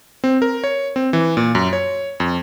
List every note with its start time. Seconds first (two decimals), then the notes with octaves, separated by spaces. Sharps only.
0.24 C4
0.42 A#4
0.64 C#5
0.96 C4
1.13 E3
1.37 A#2
1.55 F#2
1.73 C#5
2.20 F2